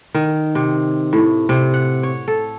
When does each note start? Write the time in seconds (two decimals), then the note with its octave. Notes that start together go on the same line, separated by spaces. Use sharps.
0.14 D#3
0.55 C3
1.13 A2
1.49 C3
1.74 F#5
2.03 C#5
2.28 A4